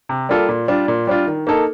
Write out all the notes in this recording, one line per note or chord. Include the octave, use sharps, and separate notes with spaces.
C3
G3 A#3 F4 A4
A#2
G3 D4 F4
A#2
G3 D4 F4
D#3
A#3 D#4 A4